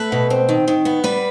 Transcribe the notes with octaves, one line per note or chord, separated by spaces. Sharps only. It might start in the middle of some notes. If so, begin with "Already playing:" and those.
Already playing: A3 B4
B2
C4
D#3
D#3
B3
G3 B4